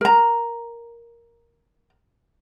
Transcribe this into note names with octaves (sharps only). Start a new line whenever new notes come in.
A#4 A#5